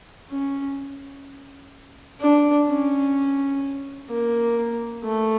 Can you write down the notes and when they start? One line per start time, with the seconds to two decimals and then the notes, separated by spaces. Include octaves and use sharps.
0.30 C#4
2.20 D4
2.67 C#4
4.09 A#3
5.04 A3